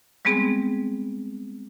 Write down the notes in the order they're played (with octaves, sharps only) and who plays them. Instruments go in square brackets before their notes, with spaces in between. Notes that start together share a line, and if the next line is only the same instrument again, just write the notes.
[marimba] G3 G#3 B3 C4 G#4